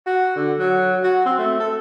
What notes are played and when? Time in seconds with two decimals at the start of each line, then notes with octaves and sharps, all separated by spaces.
0.07 F#4
0.36 D3
0.59 F#3
1.04 F#4
1.26 C4
1.39 A3
1.60 A4